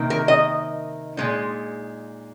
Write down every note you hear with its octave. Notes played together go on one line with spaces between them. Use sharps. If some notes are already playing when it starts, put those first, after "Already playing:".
Already playing: C3 D#3 A#3 D#4
A#4
D#5
A#2 G#3 D#4